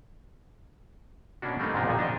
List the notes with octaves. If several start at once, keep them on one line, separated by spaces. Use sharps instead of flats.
B2 A#3 C#4 D4 F#4
G3 A3 A#3 C4 D4 D#4
G#2 C3 F3 A#3 D4 D#4
A#1 F2 A#2 F3 F#4 G#5
C4 D4 D#4 G4 D#5